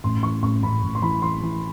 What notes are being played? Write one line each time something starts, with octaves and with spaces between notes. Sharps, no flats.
A1 C6
E3 C#6
A1 C#6
A1 B5
A1
C6
E3 B5
E3 C6
E3